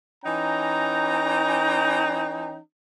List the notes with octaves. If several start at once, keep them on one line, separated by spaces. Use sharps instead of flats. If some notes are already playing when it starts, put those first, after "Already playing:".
E3 C#4 D#4 G5 A#5